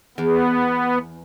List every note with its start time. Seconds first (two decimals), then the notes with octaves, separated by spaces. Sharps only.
0.18 E2 B3